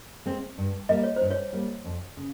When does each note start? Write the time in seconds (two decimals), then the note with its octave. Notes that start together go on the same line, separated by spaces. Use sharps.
0.26 G#3 C4
0.58 G2
0.89 G3 A#3 D#5
1.03 C#5
1.16 G2 C5
1.31 C#5
1.53 G3 A#3
1.84 F2
2.17 C#3